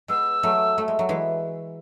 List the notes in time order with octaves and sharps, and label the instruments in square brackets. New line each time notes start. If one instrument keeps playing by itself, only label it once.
[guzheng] G#3 B3 [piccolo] E6
[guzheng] F#3 A3
A3
G#3
F#3
E3 G#3